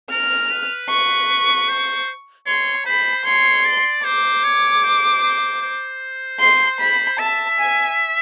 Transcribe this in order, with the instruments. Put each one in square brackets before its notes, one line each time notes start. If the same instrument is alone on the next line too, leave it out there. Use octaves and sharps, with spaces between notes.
[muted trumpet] A#4 [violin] F6
[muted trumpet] B4
[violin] C#6
[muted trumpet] C5
[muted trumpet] C#5 [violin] C6
[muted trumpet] C5 [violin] B5
[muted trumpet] C#5 [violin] C6
[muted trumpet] D5
[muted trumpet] C5 [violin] D6
[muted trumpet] C#5
C5
C5
C5
[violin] C6
B5
[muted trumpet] E5 [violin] A5
[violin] G#5